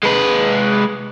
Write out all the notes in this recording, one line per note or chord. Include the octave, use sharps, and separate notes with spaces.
G#3 B4